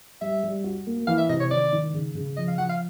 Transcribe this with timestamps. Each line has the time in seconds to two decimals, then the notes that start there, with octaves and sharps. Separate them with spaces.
0.21 G3 E5
0.43 G3
0.64 F#4
0.87 A#3
1.07 E3 F5
1.18 E5
1.29 C3 D#5
1.40 C#5
1.51 D#3 D5
1.73 D#3
1.94 C#3
2.15 C#3
2.37 F3 D#5
2.48 F5
2.58 F3 F#5
2.69 F5